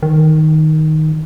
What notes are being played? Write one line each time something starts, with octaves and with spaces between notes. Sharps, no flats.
D#3